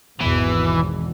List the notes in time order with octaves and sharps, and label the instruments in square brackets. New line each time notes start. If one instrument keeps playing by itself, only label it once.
[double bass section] G#1 E2 B2 [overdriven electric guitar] E3